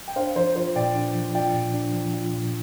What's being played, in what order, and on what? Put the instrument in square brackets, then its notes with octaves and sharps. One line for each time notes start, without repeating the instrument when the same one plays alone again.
[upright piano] G5
[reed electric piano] D4 [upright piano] C5 F5
[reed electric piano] F3 [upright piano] C5
[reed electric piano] F4 [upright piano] C5
[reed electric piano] A#2 [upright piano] D5 G5
[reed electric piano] D4
F3
[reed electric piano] F4 [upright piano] D5 G5
[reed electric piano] A#2
D4
F3
F4
A#2